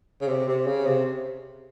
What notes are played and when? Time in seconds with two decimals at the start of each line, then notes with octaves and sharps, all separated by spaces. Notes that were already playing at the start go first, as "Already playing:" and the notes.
0.21 C#3
0.28 C3
0.48 C3
0.67 C#3
0.86 C3